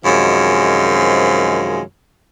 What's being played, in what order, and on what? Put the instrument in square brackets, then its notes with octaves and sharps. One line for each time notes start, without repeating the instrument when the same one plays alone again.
[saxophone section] F#2 C3 D#3 F3 G#3